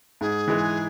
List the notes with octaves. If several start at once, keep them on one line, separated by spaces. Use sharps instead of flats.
G#2 G#4
E3 G#3